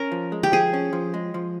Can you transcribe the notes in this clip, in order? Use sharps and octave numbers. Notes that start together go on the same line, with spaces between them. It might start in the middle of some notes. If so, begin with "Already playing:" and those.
Already playing: C#4 A#4
F3
G#3
G4
F3 G#4
C#4
F3
G#3
F3